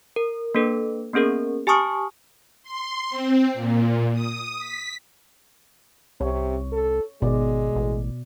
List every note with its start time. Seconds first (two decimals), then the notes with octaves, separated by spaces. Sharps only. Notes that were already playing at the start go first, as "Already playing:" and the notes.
0.16 A#4
0.55 A#3 D4 A4 B4
1.13 A#3 B3 C#4 G#4 A#4
1.67 G4 G#5 A5 C#6 D#6 F6
2.63 C6
3.10 C4
3.54 A#2
4.13 D#6
4.59 B6
6.21 C2 C3 C#5
6.72 A4
7.22 G#1 B2 G#3 D5
7.76 A1